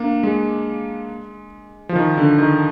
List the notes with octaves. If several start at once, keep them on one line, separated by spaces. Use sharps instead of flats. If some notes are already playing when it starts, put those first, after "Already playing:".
Already playing: A#3 D4
G#3
F3
D#3
D3
D#3